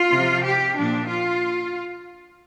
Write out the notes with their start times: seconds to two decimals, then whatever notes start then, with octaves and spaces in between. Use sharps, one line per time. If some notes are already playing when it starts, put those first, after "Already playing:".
Already playing: F4
0.12 C3 F3
0.44 G4
0.77 A#2 F3 D4
1.09 F4